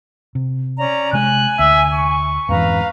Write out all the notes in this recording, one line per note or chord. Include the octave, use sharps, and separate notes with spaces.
C3
C#4 D5 A#5
C3 G#3 G#5 F#6
D2 E5
C#6
F2 G#2 E3 B4 F5 A#5